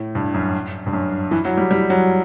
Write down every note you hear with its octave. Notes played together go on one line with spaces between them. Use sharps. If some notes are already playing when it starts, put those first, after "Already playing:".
Already playing: A2
G2
F#2
G2
F#2
E3
F#3
G3
G3
F#3